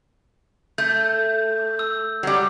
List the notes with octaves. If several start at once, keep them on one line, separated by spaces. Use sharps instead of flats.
A3 G6
E6
F#3 G3